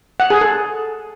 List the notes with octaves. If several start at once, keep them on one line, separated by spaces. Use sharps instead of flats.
F#5
G#4
A4